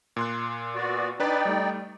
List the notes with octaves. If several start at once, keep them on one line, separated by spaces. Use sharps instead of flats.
A#2 C6 F#6
B3 F#4 D5
D4 D#4 B4 D5 G5 B5
G3 A3